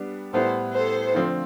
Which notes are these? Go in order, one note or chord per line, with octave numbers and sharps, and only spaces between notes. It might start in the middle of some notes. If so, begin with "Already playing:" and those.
Already playing: G3 B3 D4
A2 G3 B3 E4 A4 B4 C5
A4 C5
D3 F3 A3 C4 F4